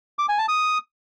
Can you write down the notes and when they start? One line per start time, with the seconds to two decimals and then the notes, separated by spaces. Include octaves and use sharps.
0.19 D6
0.29 G#5
0.39 A5
0.48 D#6